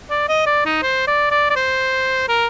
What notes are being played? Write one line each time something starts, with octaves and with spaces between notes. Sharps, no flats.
D5
D#5
D5
D#4
C5
D5
D5
D5
C5
A#4